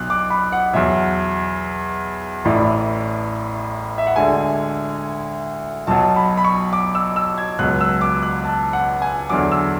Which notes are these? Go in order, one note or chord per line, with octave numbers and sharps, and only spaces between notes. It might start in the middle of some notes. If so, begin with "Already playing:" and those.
Already playing: B1 B2 F#6
D6
B5
F#5
E2 B2 F#3 E5
A1 A2 E3 D5
E5
F#5
D2 D3 G#3 G#5
B1 B2 F#3 A5
B5
B5
C#6
D6
E6
E6
G#6
C#2 B2 F#3 F#6
E6
D6
F#6
A5
F#5
G#5
E2 D3 F#3 D6
E6